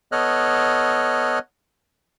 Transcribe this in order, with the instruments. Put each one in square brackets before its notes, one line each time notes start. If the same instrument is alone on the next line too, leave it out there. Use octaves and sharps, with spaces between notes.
[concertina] B3 A4 C#5 D#5 F6 F#6